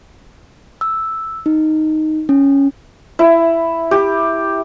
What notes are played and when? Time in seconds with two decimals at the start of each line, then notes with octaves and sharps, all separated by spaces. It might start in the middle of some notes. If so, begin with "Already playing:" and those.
0.81 E6
1.46 D#4
2.29 C#4
3.19 E4
3.91 G4